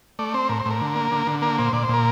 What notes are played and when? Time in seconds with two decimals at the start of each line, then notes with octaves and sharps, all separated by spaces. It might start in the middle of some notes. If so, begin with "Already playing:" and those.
0.19 A3 D5
0.34 C4 C5
0.49 A2 A#4
0.60 C5
0.65 A2
0.71 A#4
0.81 D3
0.96 A#3
1.12 D3
1.27 D3
1.42 A#3 A#4
1.58 A#2 C5
1.73 A#2 D5
1.83 C5
1.89 A#2 A#4